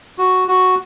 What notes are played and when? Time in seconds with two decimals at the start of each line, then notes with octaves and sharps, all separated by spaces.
0.18 F#4
0.48 F#4